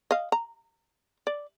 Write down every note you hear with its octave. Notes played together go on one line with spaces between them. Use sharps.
D#5 F5
A#5
D5